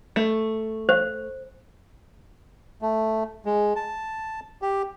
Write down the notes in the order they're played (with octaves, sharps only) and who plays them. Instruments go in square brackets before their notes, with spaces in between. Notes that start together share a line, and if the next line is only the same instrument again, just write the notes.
[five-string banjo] A3
[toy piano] C5
[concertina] A3
G#3
A5
G4